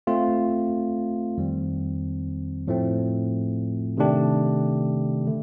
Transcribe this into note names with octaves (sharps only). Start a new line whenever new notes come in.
A3 C4 F4
F2 D#3 G3 C4
A2 F3 A3 C4
C3 D#3 A3 D4 G4
D3 A3